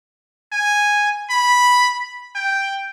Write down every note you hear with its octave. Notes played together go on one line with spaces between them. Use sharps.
G#5
B5
G5